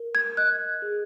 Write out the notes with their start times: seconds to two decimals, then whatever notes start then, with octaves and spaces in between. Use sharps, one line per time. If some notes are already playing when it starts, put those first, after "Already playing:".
Already playing: A#4
0.15 G#6
0.37 D#5 F#6
0.82 G#4